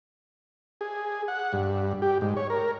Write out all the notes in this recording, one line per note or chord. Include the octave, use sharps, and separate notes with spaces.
G#4
F#5
G2
G4
G#2
C#5
A#4